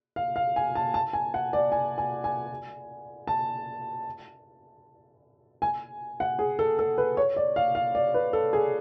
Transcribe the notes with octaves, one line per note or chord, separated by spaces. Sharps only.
F5
F5
G#5
A5
A5
G#5
F#5
D5
G#5
G#5
G#5
A5
G#5
F#5
G#4
A4
A4
B4
C#5
D5
F5
F5
D5
B4
A4
G#4